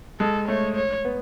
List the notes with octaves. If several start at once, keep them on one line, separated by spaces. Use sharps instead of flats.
G#3 A4
A3 C#5
C#5
B3